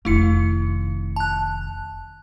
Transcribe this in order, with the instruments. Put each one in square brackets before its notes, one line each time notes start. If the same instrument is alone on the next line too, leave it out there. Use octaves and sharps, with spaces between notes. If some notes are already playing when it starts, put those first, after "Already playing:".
[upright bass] F1 D#3 [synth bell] A3 E4 C#7
[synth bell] A5 F#6